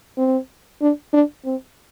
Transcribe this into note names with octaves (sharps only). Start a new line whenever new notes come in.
C4
D4
D4
C4